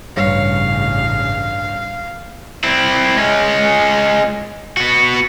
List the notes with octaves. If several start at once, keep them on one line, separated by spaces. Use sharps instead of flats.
A1 G2 C#3 C#5 F5
C4 E4
G#3 C#4
B3 F#4